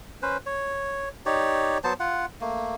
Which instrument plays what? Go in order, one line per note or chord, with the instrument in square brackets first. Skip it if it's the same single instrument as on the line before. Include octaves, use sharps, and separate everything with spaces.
[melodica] C#4 B4 C5
C#5
D#4 G4 C#5 D5
F#3 B3 C5 A5
F4 F#5
A3 A#3